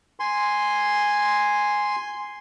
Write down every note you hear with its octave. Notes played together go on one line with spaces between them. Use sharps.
G#5 C6